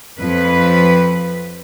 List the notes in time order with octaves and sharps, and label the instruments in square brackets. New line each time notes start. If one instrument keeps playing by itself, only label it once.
[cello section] F2 F3 B4